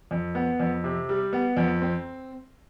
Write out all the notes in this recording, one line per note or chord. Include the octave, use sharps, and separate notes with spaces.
F2
B3
F2
C3
G3
B3
F2
C4